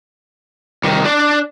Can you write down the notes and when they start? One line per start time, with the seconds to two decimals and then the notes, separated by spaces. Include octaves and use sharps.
0.84 C2 D#3
1.05 D4 D5